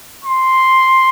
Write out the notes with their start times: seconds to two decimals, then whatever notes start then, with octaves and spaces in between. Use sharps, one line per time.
0.25 C6